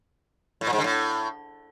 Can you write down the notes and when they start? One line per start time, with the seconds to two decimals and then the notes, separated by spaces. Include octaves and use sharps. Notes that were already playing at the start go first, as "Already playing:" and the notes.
0.61 A2
0.67 A#2
0.73 G#2
0.78 D3
0.84 A2